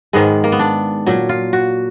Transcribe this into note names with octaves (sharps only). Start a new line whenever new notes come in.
G#2 D#3 G#3 B3
A#3
B3
D4
A#2 F#3
F4
F#4